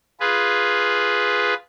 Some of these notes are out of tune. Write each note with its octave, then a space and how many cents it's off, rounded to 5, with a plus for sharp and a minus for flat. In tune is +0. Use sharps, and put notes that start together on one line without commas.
F4 +0 G#4 +0 B4 +0